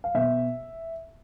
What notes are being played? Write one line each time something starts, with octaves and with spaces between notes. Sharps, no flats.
F5
B2 E5